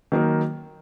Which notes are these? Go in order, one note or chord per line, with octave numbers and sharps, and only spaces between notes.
D#3 F#3 A#3 D#4